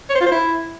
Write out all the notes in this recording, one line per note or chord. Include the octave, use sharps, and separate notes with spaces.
C#5
C5
F4
C5
E4